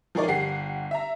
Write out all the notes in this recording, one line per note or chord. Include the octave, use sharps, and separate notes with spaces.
F3 D#4 G#4 A#4 C#5 D5
G1 G4 F#5 C7
E5 A#5